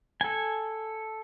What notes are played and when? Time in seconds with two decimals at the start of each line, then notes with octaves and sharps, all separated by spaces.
0.21 A4 G#5